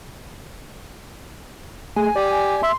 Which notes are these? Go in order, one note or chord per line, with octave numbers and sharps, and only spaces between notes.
A3 G#4 G#5
G4 D5
E5 C6